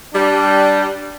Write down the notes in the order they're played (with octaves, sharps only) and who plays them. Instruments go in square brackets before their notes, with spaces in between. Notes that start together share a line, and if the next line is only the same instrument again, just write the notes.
[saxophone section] G3 [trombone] D4